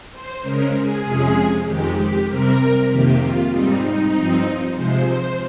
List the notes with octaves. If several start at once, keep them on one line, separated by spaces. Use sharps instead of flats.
C5
C#3 G#3 C#4 A#4
G#4
F2 C3 F3 G#3 C#4
F2 D#3 G#3 G4
G4
C3 G3 C4 A#4
F2 C3 D#3 A#3 G4
F4
G#2 G3 C4 D#4
D#4
G2 F3 C4
C3 F3 G#3 C5
C5